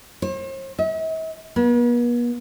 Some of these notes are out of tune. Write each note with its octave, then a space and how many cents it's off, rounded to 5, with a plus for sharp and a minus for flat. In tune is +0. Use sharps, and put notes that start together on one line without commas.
C5 +45
E5 -45
B3 -45